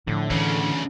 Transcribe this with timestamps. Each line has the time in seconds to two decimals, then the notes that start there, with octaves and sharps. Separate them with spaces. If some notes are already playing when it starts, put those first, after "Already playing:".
0.07 A2 D3 F3
0.30 D2 C#3 E3